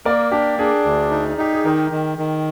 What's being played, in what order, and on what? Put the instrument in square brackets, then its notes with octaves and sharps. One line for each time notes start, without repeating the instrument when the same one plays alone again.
[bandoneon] A#3 [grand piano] A#4 D5
[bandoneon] D4 [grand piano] G4
[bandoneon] D4 [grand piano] G#4
[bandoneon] D2
D#4
[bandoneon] D#4 [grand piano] G4
[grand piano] G#4
[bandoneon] D#3 [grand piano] G4 A#4
[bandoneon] D#3
D#3